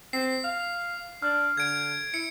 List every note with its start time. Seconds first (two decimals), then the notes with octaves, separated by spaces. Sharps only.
0.13 C4 C7
0.44 F5
1.22 D4 F6
1.57 D3 G#6 D7
2.14 E4 C#7